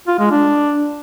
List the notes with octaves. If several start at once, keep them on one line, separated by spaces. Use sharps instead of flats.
F4
G#3
D4